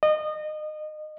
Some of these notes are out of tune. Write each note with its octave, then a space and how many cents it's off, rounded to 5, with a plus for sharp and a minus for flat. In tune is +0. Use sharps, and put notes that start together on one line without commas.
D#5 -25